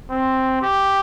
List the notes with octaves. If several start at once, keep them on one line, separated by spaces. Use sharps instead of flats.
C4
G4